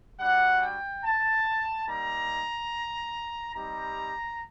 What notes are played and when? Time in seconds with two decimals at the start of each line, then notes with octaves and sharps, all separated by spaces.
0.19 G3 D4 F#4 F#5
0.61 G5
1.03 A5
1.86 G3 A#3 D#4 G4 A#5
3.53 G3 C4 D#4 G4 A#5